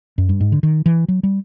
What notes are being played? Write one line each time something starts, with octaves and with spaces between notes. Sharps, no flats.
F#2
G2
G#2
D3
D#3
E3
F#3
G3